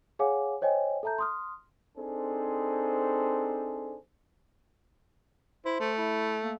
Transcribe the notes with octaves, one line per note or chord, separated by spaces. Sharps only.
G#4 C#5 F5 F#5 G#5 D6
C5 C#5 D#5 G5 G#5
A4 E5 A5 A#5 G6
C6 D#6 F6
C4 D4 D#4 G#4 A4 C5
E4 C5
A3
E4
A#3